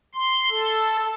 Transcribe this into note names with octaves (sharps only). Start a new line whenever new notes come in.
C6
A4